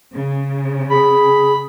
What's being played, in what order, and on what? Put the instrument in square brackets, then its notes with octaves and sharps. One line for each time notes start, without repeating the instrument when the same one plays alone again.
[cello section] C#3
[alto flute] G#4 [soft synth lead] B5